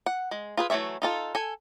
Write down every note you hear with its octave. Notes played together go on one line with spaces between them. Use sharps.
F#5
G#3
F4 G#4 B4
E3 F#3 A3 C#5 E5
D#4 F4 A4
A4 G#5